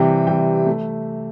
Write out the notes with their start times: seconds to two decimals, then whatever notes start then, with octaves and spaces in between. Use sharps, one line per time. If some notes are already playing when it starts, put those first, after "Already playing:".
Already playing: C3 E3 G3 G5
0.27 C3 E3 G3 G5
0.66 A3